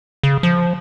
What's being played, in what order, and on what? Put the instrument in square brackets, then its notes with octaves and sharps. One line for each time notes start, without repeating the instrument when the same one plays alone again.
[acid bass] C#3
F3